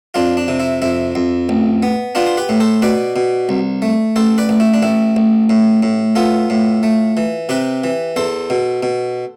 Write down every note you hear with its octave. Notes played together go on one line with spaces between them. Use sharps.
F2 D4 F4
D4
C3
E4
F2 E4
F2
A1
B3
B3 D4 F4
C5
G4 B4
A2
A4 C5
B2 B4 D5
B2
C2
A3
A1 A4 C5
B4 D5
A1
E4
D4
A1 E4
A1
A2
A2
B3 F4 A4
A2
A3
E3
C3 G4 B4
E3
E2 A4 C5
B2
B2